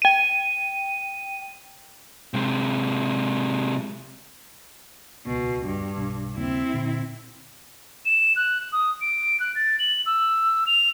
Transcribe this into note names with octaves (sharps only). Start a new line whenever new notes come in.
G5 D#7
C3 G#3
D#1 C#2 B2
G2
B1
D#2 C#3 A#3 C4 E4
A#2 D3
E7
F#6
D#6
D7
F#6
A6
F#7
E6
F7